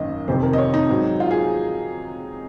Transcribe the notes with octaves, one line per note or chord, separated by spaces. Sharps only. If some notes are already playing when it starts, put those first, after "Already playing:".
Already playing: G#1 F#2 D#3 A#3 C#4 D#5
F1 F2 C3 D#3 C5
A#4
D#5
C#5
D#4
G#2 F#3 C4
F4
G#4